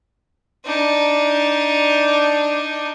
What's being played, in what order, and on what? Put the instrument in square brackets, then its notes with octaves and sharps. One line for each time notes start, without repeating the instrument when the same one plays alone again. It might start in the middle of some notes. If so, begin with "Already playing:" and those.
[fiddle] D4 D#4